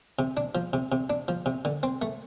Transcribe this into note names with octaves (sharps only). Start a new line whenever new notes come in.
C3
D4
F3
C3
C3
D4
F3
C3
D3
C4
A3